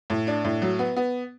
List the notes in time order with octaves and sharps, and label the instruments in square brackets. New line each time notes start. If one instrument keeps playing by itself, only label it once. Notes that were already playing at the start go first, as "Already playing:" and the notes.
[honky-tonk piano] A2
D4
A2
F#3
B3
B3